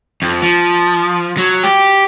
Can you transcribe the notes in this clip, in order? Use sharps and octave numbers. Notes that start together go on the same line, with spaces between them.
F2
F3
F#3
G4